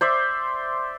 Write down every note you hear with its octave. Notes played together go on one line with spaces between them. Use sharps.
C5 D5 E5